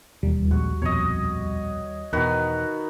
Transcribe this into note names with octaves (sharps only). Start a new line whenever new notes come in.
E1 D#2 G3
A#1 G#3 F#4
A#1 F2 B2 C#5 D#5
E2 B2 D#3 F#4 B4